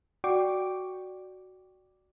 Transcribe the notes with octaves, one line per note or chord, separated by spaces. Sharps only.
F#4 D5 G5 C#6 D6